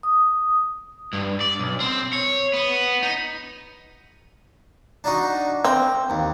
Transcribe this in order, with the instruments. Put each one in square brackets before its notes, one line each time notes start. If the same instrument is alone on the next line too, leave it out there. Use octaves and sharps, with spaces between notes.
[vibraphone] D#6
[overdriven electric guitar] G2
D5
B1
C4
C#5
B3
D#4
[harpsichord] D4 D#4 F#4
[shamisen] C4 [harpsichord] A#5
[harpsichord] D#2